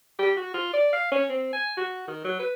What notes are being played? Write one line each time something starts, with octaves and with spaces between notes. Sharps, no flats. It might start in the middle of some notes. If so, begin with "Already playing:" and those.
G4
F#4
F4
D5
F5
C#4
C4
G#5
F#4
D#3
F#3
B4